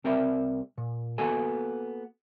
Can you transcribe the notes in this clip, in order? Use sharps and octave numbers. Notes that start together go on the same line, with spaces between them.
C2 C4 A#4 D5 E5
A#2
A#3 B3 F#4 A4 G#5